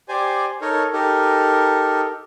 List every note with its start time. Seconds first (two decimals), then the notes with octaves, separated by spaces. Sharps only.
0.09 G4 C5 D5 G#5
0.62 D#4 A4 A#4 C#5
0.93 D#4 G4 A4 A#4